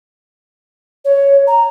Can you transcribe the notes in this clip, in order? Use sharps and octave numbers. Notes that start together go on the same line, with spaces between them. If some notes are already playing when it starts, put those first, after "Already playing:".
C#5
A#5